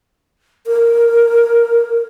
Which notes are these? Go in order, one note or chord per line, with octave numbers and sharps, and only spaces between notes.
A#4